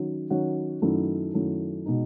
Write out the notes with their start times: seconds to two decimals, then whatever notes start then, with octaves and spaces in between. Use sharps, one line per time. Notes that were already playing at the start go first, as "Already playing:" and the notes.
Already playing: D#3 F#3 C#4 F#4
0.30 D#3 F#3 C#4 F#4
0.82 F#2 D#3 F#3 A3 E4
1.34 F#2 D#3 F#3 A3 E4
1.86 B2 G#3 D#4